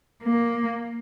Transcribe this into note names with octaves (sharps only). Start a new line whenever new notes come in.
A#3